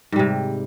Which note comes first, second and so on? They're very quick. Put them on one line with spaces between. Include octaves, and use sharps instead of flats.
G#2 G3 C3